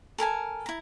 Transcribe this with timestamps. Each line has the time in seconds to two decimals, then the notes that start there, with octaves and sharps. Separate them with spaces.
0.18 A4 A#4 G#5 A5
0.66 E4 A#5